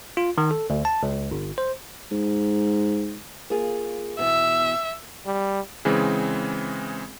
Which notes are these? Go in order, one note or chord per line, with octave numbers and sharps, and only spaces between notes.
F4
D#3
A4
D2
A5
C#2
G1
C5
G#2
A#3 F4 G#4
B2 E3 E5
G3
C#3 E3 G#3 C4 G#4